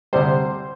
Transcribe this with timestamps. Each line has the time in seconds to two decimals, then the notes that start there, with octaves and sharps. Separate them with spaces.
0.13 D2 C3 G3 C5